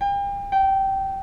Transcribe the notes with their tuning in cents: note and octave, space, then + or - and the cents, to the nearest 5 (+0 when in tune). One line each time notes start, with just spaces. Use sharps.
G5 +40
G5 -15